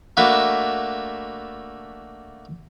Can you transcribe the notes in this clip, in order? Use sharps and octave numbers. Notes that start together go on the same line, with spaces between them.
A3 A#3 D4 F#4 B4 E5